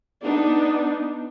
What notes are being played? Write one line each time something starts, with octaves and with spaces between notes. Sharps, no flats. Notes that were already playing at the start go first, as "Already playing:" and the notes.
B3 D4 D#4